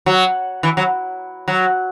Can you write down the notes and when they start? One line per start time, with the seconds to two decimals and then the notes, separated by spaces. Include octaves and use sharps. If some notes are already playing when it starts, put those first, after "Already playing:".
0.06 F#3
0.63 E3
0.77 F#3
1.48 F#3